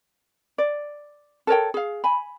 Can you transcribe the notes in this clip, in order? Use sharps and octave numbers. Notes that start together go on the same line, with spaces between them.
D5
A4 A#4 C#5 G5
G#4 F5
G#5 B5